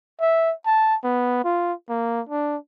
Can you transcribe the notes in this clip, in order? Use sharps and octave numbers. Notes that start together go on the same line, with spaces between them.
E5
A5
B3
F4
A#3
D4